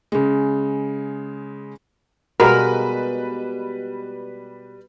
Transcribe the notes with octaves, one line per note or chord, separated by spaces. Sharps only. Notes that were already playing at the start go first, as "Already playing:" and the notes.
C#3 G#3
B2 G3 G#3 A#4 B4 B5